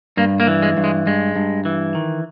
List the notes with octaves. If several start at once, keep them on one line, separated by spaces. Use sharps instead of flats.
G2 A#3
A#3
E3
G#3
G2
G#3
G2 G#3
G2
E3
D#3